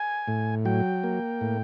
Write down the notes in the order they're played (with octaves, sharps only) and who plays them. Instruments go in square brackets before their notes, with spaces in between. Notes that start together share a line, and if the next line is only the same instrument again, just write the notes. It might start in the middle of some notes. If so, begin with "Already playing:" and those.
Already playing: [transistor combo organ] G#5
A2
F#3 G5
A#3
A2